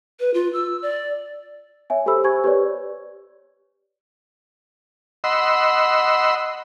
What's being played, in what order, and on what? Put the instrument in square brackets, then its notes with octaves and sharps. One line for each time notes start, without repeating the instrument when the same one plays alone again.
[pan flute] B4
F4
E6
D5
[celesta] C#5 E5 G#5
G4 A4 C5 B5 E6
G4 C5 G#5 C#6 G#6
G4 B4 C#5 D5
[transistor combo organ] D#5 F#5 B5 C6 E6